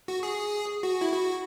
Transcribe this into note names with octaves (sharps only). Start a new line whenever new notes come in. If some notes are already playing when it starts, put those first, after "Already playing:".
F#4
G#4
F#4
E4
F#4